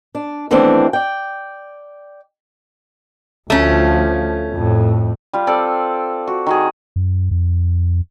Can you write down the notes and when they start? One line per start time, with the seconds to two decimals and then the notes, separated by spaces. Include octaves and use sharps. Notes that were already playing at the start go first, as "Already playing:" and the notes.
0.15 D4
0.51 D#2 E3 A3 B3 C4 D4
0.93 D5 G5
3.50 D2 F3 A3 C#4
4.53 F2 A2
5.33 G3 F4
5.47 C4 A4 D5
6.27 F#4
6.47 D#3 F#4 G#4
6.96 F#2
7.31 F2